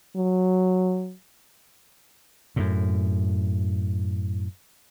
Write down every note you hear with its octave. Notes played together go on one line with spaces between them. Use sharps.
F#3
F#2 A2